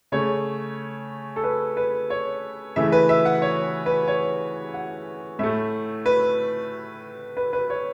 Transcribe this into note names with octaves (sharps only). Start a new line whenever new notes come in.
C#3 A3 C#5
A4
B4
B4
C#5
C#3 E3 A3 E5
B4
E5
F#5
C#5
B4
C#5
F#5
A2 A3 E5
B4
B4
B4
C#5